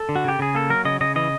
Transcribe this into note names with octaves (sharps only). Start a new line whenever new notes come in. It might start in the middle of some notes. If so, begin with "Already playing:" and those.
Already playing: A4
D3
F#4
C#3 G4
C#3 G#4
A#3 A4
F#3 A#4
C#3 D#5
C#3 D#5
E3 D#5